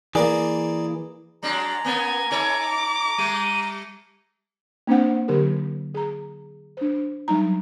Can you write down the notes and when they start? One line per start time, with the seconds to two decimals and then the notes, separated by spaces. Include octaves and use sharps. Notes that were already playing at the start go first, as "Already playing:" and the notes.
0.15 E3 A#3 G#4 A#4 D5
1.43 F#3 G#3 D4 A#5
1.84 A#3 B3 C#4 G#5
2.31 D#4 A4 C#5 D6
3.18 G3 A3 D#7
4.87 A#3 C4 D4 C5 F#5
5.28 D3 F#3 G4 A#4
5.95 G#4 A#5
6.77 D4 C5
7.28 F#3 G3 D#4 A#5